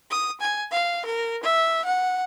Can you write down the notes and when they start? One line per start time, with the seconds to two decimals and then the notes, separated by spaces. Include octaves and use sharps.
0.10 D#6
0.41 G#5
0.72 F5
1.05 A#4
1.43 E5
1.85 F#5